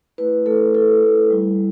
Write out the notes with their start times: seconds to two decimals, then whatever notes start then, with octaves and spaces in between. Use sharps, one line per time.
0.18 A3 E4 B4
0.46 A3 E4 A4
0.74 A3 E4 A4
1.03 A3 E4
1.30 G3 E4